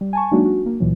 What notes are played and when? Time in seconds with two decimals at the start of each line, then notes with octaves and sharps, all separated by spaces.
0.01 G3
0.13 G#5 A5 C#6
0.31 F#3 G#3 A#3 D4 D#4 F#4
0.45 F#4
0.66 A#3
0.80 C#2 A#2 E3 F#3